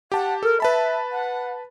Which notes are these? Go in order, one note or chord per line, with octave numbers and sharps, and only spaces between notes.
G4 F#5 A5
A4 A#4
B4 E5 A5 B5
F#5